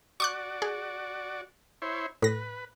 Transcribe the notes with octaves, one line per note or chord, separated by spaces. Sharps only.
F#4 D5 C#6 D6 F#6
G#4
E4 C5 C#5
A2 B4 A#6